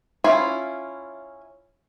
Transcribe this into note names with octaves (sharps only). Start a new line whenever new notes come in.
C#4 E4 F4